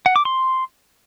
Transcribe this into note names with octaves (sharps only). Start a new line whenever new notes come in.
F#5
D6
C6